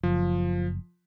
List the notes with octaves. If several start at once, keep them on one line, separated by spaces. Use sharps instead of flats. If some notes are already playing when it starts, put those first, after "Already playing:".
F#1 F3